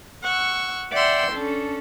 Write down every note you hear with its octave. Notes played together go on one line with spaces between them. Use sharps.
F#5 C#6 E6
D5 E5 F#5 G5 C6 E6
C#4 D4 A4